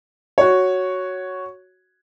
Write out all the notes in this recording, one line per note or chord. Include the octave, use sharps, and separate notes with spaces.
F#4 C#5